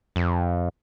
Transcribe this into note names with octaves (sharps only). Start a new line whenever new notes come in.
F2